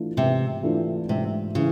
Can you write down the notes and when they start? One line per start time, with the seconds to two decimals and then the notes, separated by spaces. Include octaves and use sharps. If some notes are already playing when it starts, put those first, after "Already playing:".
Already playing: E3 A3 D4 F4
0.17 G#2 C3
0.63 E3 A3 D4 F4
1.09 G#2 C3
1.55 C#3 E3